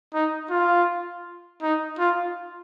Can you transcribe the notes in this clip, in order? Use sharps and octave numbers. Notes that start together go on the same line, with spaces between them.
D#4
F4
D#4
F4